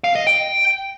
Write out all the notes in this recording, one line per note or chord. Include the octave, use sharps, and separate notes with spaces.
F5
D#5
G5